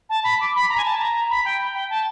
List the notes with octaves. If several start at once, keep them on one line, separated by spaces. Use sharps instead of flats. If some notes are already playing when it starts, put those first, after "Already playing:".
A5
B5
D6
B5
A#5
G#5
A5
A#5
B5
G5
G5
A5